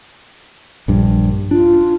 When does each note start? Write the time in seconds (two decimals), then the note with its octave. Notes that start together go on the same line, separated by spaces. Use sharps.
0.88 A#1 G2
1.51 D4 F4